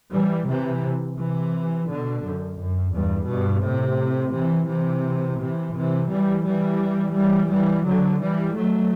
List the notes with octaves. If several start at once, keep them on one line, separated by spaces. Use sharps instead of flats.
E3 G3
C3 E3
C3 E3
B2 D3
F#2
F#2
E2 G2
G2 B2
A2 C3
C3 E3
C3 E3
C3 E3
C3 E3
E3 G3
E3 G3
E3 G3
E3 G3
D3 F#3
E3 G3
F#3 A3